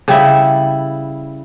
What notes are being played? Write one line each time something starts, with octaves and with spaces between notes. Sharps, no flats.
C#3 G3 E4 E5